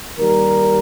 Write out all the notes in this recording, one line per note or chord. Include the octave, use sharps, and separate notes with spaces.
D#2 D#3 G3 A#4